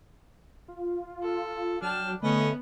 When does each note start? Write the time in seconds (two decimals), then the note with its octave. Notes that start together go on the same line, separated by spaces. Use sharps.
0.68 F4
1.22 A4
1.82 F#3 D4 G5 A5 F6
2.23 D3 A3 B3 C#4 B4 D#5